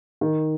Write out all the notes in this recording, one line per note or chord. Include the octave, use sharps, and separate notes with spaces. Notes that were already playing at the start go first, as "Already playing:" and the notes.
D#3